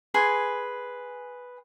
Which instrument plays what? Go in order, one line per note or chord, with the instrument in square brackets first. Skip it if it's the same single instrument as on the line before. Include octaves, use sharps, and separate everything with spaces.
[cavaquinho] G#4 B4 G#5 C6